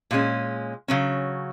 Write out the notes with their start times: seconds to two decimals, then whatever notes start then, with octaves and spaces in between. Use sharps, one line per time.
0.11 A#2 G#3 C#4
0.88 C#3 F#3 C#4